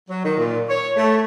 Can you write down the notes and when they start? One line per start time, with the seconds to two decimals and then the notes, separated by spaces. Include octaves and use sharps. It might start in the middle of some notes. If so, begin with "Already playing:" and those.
0.09 F#3
0.23 D#3
0.38 A#2
0.69 C#5
0.97 A3